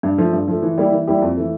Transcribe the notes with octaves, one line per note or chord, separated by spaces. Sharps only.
G2
F3 A3
G2
F3 A3
E3
G3 A#3 E4 G4
E3
G3 A#3 E4 G4
F2
E3 A3